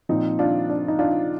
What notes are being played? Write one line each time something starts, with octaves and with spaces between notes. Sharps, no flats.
A#2 F3 C4 D#4
D4 F4
D4
D#4
D4 F4